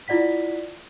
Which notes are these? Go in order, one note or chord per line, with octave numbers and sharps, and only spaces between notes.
E4 F4 D5 F#5 B6